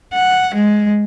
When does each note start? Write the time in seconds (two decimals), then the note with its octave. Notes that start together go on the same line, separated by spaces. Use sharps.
0.13 F#5
0.55 G#3